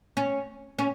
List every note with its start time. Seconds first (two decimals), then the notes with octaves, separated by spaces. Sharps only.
0.17 C#4
0.79 C#4